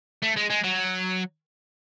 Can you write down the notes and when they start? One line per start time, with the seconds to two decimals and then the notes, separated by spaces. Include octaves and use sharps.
0.22 A3
0.36 G#3
0.50 G#3
0.64 F#3